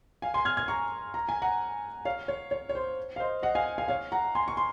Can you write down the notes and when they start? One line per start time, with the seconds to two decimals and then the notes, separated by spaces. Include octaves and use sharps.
0.22 F5 G#5
0.34 G#5 C6
0.45 F6 G#6
0.57 F6 G#6
0.68 A#5 C#6
1.14 A#5
1.29 G#5
1.42 F#5 A#5
2.05 C#5 F5
2.28 C#5
2.51 C#5
2.69 C#5
2.75 C5
3.16 F5
3.20 C5 D#5
3.43 D#5 F#5
3.55 F5 G#5
3.78 F5 G#5
3.88 C#5 F5
4.12 F#5 A#5
4.35 G#5 C6
4.48 C#6
4.57 C6